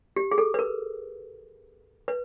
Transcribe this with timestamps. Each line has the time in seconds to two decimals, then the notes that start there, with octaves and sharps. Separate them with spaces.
0.16 G4
0.31 G#4
0.38 A4
0.54 B4
0.59 A#4
2.08 B4